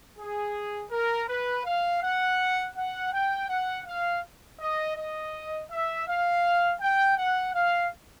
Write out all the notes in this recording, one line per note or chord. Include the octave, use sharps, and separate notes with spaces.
G#4
A#4
B4
F5
F#5
F#5
G5
F#5
F5
D#5
D#5
E5
F5
G5
F#5
F5